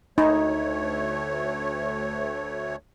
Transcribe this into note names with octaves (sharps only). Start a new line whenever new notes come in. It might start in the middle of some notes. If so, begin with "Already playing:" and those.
D2 A3 D#4 C#5